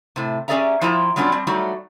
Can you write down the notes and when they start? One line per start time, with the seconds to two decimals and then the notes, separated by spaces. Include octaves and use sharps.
0.16 A2 C3
0.48 C#4 G4 G#4 D5 E5 A#5
0.81 F3 E4 F4 D#5 G5 A#5
1.16 F#3 G3 B3 C#4 D4 F4
1.32 G3 C4
1.47 F#3 G3 A3 D#4 F#4